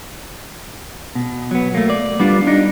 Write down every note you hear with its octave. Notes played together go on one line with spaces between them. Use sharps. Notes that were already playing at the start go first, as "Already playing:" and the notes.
B2
F#3 B3
A3 A#3
D5
G3 B3 D4 F4
D4 D#4